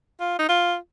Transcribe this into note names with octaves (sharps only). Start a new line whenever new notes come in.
F4
D#4
F4